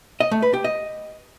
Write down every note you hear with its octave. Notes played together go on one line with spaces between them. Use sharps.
D#5
A3
B4
G4
D#5